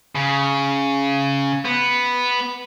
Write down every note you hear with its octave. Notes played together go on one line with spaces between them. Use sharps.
C#3
B3